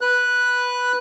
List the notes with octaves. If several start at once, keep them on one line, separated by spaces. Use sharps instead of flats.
B4 F#6